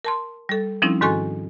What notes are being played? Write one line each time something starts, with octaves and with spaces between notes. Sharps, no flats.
A#4 A5 C6
G3 A4
F3 G3 C4 C#4 D#4 E4
G#2 D#3 F#4 A4 G#5 C#6